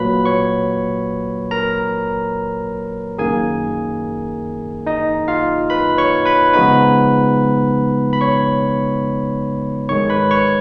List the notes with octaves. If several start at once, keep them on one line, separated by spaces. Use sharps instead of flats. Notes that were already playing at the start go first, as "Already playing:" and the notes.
Already playing: A#2 F#3 A#3 B4 B5
C#5 C#6
A#4 A#5
F#2 D#3 A#3 G#4 G#5
D#4 D#5
F4 F5
B4 B5
C#5 C#6
B4 B5
C#3 F3 G#3 B3 D#4 B4 B5
B5
C#5 C#6
G#2 D#3 G#3 C#5 C#6
B4 B5
C#5 C#6